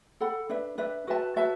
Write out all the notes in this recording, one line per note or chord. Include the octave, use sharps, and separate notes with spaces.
A4 F#5 B5
D4 B4 E5
D4 B4 E5
F#4 B4 E5 A5
F#4 B4 E5 A5